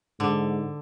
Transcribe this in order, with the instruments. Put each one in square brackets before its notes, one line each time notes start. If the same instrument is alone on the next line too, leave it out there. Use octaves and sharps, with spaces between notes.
[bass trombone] G#2 [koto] D3